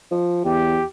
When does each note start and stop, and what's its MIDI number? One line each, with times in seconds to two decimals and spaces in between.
0.11 0.42 53
0.45 0.80 40
0.45 0.86 67